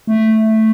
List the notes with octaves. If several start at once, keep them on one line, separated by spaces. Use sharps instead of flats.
A3